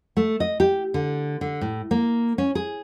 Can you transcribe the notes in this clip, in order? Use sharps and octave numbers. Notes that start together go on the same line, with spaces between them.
A3
D#5
G4
D3
D3
A2
A#3
C#4
G#4